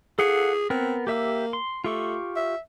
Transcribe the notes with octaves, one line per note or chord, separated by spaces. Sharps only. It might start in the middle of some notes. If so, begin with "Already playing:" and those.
G#4 A4 F5 F#5
B3 C4 A#4
A#3 G4 E5 E6
C6
A3 F4 G4 C#6
E5